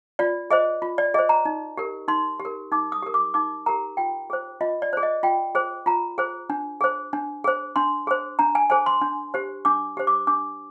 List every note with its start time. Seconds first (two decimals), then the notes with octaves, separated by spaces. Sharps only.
0.19 F4 D5
0.51 G#4 C5 D#5
0.82 F4
0.98 D5
1.14 G#4 D#5
1.19 C5
1.29 A#5
1.45 D#4
1.77 G4 A#4
2.08 D#4 C6
2.40 G4
2.45 A#4
2.72 D#4 D6
2.92 D#6
3.03 G4 A#4
3.14 D6
3.34 D#4 D6
3.66 G4 A#4 A#5
3.97 F4 G5
4.30 G#4 C5
4.61 F4 D#5
4.82 D5
4.93 G#4 C5
5.03 D#5
5.23 F4 G5
5.55 G#4 C5
5.86 F4 A#5
6.18 G#4 C5
6.50 D4
6.81 G#4 C5
7.13 D4
7.44 G#4 C5
7.76 D4 C6
8.07 G#4 C5
8.39 D4 A#5
8.55 G#5
8.70 G#4 C5 G#5
8.86 C6
9.01 D4
9.34 G4 C5
9.65 D4 D6
9.97 G4 C5
10.07 D6
10.27 D4 D6